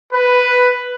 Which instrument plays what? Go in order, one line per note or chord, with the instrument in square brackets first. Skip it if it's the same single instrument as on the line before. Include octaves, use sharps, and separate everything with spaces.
[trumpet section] B4